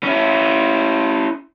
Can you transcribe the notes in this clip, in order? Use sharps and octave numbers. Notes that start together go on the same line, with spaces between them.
C#4 E4